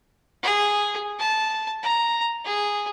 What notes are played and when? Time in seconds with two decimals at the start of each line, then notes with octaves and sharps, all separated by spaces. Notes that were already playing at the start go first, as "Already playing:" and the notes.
0.43 G#4
1.19 A5
1.83 A#5
2.45 G#4